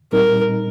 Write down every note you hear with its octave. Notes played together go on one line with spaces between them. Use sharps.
A#2 G3 C4 D#4 A#4